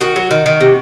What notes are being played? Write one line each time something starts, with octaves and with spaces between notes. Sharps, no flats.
D#3 F#4
F#3
D#3
D#3
C3